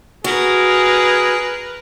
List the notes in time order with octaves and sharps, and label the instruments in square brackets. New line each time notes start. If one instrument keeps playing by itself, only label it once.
[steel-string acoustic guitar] F#4 [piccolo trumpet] G#4 [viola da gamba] A#4 B4